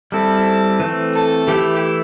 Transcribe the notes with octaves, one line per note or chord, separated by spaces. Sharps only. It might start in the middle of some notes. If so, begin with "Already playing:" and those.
G3 C4 E4 A4
E3 A3 C4
A4
E3 A3 E4 G4